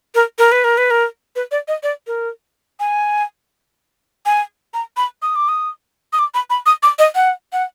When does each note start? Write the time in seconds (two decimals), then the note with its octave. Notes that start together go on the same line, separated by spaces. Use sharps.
0.15 A#4
0.39 A#4
0.52 B4
0.64 A#4
0.78 B4
0.91 A#4
1.36 B4
1.51 D5
1.68 D#5
1.83 D5
2.07 A#4
2.80 G#5
4.26 G#5
4.74 A#5
4.97 B5
5.22 D#6
5.36 D6
5.49 D#6
6.13 D#6
6.19 D6
6.34 B5
6.50 B5
6.66 D#6
6.83 D6
6.99 D#5
7.15 F#5
7.53 F#5